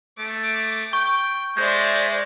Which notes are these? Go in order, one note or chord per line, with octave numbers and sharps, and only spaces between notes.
A3 D6
G5 C#6
G#3 C5 D5 E5 G6